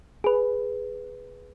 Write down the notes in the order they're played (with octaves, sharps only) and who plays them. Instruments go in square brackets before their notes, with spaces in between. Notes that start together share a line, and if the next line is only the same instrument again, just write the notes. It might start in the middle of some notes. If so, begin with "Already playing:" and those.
[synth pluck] G#4 B4